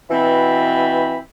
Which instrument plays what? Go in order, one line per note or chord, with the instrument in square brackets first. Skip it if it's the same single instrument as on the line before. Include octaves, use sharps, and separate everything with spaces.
[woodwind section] B2 C4 B5 [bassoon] E3